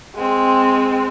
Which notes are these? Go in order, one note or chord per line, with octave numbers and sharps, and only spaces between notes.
G#3 C4